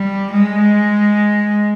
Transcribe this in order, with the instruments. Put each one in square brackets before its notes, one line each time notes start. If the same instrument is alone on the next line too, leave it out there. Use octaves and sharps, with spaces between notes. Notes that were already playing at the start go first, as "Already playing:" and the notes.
Already playing: [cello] G3
G#3